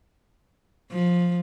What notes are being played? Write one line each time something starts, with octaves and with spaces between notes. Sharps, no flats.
F3